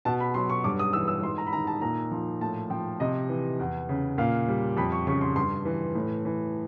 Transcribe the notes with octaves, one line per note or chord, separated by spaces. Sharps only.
B2 A5
B5
F#3 C6
C#6
G2 D6
D#6
E3 E6
E6
G#2 C6
A#5
B5
D#3 A#5
A5
A#2 A#5
F3
A2 A5
F3 G5
C3 D#5
E3
E2
C#3
A#2 F5
G3
F2 B5
C#6
C#3 C#6
C6
G2 C6
E3
A2
E3